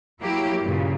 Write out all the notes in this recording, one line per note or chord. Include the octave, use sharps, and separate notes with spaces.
F#3 A#3 E4 G4
G2 A#2 C#3